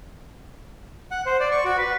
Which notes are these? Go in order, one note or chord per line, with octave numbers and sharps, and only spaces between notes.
F#5
C5
D5
C#6
F#4
B4